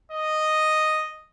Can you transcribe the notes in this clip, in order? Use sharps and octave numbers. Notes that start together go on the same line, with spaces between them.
D#5